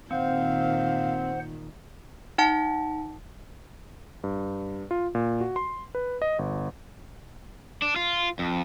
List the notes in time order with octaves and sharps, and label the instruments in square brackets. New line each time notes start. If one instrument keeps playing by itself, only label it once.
[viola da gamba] A#2 D#3 [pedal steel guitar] C4 [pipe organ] C5 F#5 [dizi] F5
[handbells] D#4 F#5 A5
[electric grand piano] G2
F4
A#2
F#4
C6
B4
D#5
G1
[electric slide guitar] D4
F4
F2